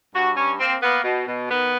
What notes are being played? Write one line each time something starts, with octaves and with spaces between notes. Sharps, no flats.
G2 F#4
G2 C#4
A#3 C4
A#3 B3
B2
B2
D#3 B3